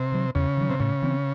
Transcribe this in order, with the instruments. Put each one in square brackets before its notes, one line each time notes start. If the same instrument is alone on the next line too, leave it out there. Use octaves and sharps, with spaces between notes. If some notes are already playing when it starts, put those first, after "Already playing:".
Already playing: [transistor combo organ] C3
[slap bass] D#3 F#3
[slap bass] E2 [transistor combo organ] C#3
[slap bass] D#3 F#3
[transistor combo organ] C3
[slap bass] A2 [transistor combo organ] C#3
[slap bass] E3 C4